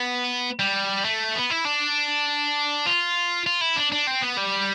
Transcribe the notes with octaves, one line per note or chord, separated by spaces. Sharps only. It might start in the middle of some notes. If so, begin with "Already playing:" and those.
Already playing: B3
G3
A3
B3
E4
D4
F4
F4
E4
D4
D4
C4
B3
G3